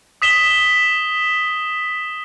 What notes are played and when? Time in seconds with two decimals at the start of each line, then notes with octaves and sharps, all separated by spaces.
0.22 D#6 B6 E7 G7